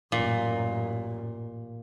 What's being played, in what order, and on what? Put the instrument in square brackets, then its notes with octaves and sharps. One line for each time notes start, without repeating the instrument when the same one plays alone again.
[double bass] A1 F#2 [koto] A#2